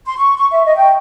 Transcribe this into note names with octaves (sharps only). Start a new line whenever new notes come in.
C6
C#6
C#6
E5
D#5
G5